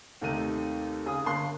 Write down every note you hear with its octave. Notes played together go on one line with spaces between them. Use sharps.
D#2 C3 A3 D#4 D#7
C#3 G#4 D#6
G1 A#3 C6 F#6